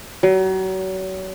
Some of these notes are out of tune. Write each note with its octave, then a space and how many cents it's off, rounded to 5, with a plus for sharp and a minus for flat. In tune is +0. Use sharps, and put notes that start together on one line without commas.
F#3 +35